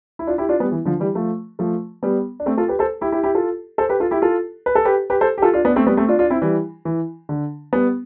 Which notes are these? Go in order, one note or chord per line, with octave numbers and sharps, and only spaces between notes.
E4
D4 F4
E4 G4
D4 F4
G3 B3
E3
D3 F3
E3 G3
F3 A3
F3 A3
G3 B3
D4
A3 C4
F4 A4
G4 B4
A4 C5
E4 G4
E4 G4
E4 G4
F4 A4
A4 C5
G4 B4
F4 A4
E4 G4
F4 A4
B4
A4
G4 B4
G4 B4
A4 C5
G4
F4 A4
D4 F4
B3 D4
A3 C4
G3 B3
A3 C4
D4 F4
D4 F4
C4 E4
E3 G3
E3
D3
G3 B3